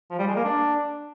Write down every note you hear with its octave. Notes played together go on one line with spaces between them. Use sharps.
F3
G3
G#3
A#3
D4